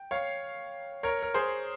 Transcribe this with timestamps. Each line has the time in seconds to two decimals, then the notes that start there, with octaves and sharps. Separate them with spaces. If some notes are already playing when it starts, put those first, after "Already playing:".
Already playing: G5
0.11 C#5 F5
1.03 A#4 C#5
1.23 A#4
1.34 G#4 C5